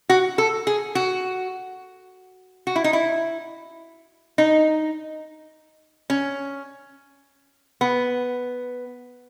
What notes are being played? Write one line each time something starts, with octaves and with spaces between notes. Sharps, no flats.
F#4
A4
G#4
F#4
F#4
E4
D#4
E4
D#4
C#4
B3